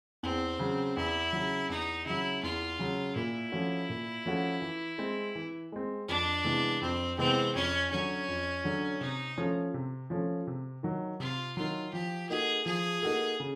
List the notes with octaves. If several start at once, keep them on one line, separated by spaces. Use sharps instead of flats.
E2 C4
C#3 F#3
E2 E4
C#3 F#3
E2 D#4
C#3 F#3 E4
E2 F4
C#3 F#3
A#2 E4
F3 A3 C#4 F#4
A#2
F3 A3 C#4 F#4
E3
G#3 C4
E3
G#3 C4
F2 D4
C3 E3 G#3 B3
F2 C4
C3 E3 G#3 B3 C4
F2 C#4
D3 F#3 C#4
F2
D3 F#3
C3 D#4
F3 A3 C#4
C3
F3 A3 C#4
C3
D#3 F#3
C3 F4
D#3 F#3 F4
F3 G4
A#3 D#4 F#4 G#4 A4
F3 G#4
A#3 D#4 F#4 A4
C#3